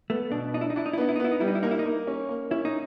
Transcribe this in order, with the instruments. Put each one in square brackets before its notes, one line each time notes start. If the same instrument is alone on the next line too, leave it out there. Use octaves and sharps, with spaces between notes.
[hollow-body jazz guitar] A3 [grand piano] B3
[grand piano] B2 [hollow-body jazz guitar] D4
[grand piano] D4 [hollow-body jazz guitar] D#4
[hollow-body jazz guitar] E4
D#4
[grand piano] D4 [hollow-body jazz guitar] E4
[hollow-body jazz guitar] D#4
E4
[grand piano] B3 [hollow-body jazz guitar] D#4
[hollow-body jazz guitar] E4
D#4
[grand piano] B3 [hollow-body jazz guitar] E4
[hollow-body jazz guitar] D#4
[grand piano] G3 [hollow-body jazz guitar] E4
[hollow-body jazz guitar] D#4
E4
[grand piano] A#3 [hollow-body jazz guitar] D#4
[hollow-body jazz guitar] E4
D#4
[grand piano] A#3
C#4
A#3
[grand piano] C#4 [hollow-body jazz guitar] E4
[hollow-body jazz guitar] D#4